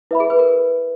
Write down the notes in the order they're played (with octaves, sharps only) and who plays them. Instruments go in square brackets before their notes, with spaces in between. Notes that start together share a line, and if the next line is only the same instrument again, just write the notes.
[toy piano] E4 [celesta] B4 E5 B5
[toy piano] G#4
B4
A#4